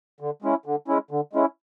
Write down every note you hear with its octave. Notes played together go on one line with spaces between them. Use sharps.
D3
G#3 C#4 E4
D3
G#3 C#4 E4
D3
G#3 C#4 E4